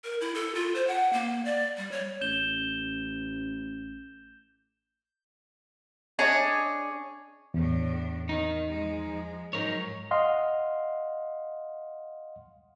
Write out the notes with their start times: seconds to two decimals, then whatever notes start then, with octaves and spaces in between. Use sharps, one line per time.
0.04 A#4
0.21 E4
0.35 A4
0.55 F4
0.75 C5
0.87 F#5
1.13 A#3
1.45 D5
1.77 G3
1.92 C#5
2.21 A1 G6 E7 G7
6.19 D4 G#4 C#5 D#5
7.54 E2 A2 D4
8.29 D#3 D#4
8.68 F3 G#3
9.53 G#2 F#3 D#4 A#4 C#5
10.11 D#5 F5 F#5 C6